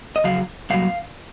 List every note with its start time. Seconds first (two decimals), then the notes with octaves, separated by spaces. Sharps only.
0.16 D#5
0.24 F2 C#3 F#3 F5
0.70 C2 A#2 F#3 F5